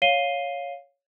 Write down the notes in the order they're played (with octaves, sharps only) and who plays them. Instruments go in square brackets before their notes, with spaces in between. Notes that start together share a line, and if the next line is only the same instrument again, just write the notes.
[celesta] C#5 F5 C7 D#7 G7